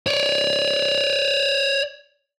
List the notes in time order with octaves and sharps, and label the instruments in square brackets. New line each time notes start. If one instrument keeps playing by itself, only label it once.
[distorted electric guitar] C#5 D5